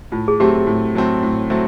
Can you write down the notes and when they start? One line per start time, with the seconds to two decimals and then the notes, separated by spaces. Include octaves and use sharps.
0.12 A2 F4
0.28 G#4
0.40 F#3 A3 C4 G4
0.67 A2
0.95 F#3 A3 C4
1.23 A2
1.50 F#3 A3 C4